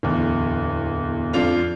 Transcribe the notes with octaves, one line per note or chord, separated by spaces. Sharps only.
D1 E2
F2 D4 F4 F7